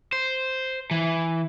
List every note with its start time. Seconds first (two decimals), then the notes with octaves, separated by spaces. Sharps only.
0.12 C5
0.91 E3